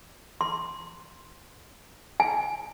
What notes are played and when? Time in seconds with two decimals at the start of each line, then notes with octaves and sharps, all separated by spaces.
0.41 C6
2.20 G#5